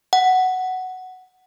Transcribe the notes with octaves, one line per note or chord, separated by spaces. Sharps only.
F#5